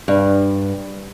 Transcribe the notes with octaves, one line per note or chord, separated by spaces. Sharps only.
G2